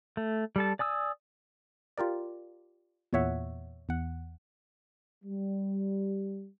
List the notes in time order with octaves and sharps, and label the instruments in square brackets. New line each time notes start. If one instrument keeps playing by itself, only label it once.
[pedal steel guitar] A3
G3 A4 A5
D5 G#5 D#6 E6
[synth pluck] F4 G4 A#4 D5
E2 A#2 C#5 E5 F#5
E2 F#5
[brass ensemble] G3